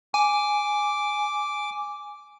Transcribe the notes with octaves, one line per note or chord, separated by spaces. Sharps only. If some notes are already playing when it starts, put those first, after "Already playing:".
G#5 D6